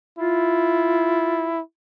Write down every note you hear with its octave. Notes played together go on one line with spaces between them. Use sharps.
E4 F4